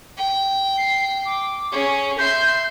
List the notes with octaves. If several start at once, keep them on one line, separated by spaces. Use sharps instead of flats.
G5
C7
D6
C#4 G#4 C#6
E5 C6 G6